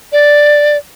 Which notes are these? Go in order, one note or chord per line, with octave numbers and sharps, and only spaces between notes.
D5